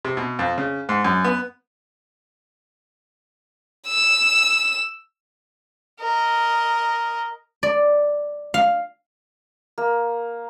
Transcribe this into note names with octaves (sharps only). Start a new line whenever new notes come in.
C3
B2
F2
C#3
G#2
F#2
B3
E6
A#4 D#5
D5
F5
A#3